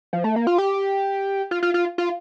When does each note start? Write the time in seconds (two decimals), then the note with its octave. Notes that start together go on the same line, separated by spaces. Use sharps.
0.13 F3
0.24 A3
0.36 A#3
0.47 F4
0.58 G4
1.51 F4
1.63 F4
1.74 F4
1.98 F4